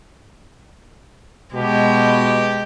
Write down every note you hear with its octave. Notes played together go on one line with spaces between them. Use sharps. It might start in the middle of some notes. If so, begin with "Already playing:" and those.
B2 G#3 G4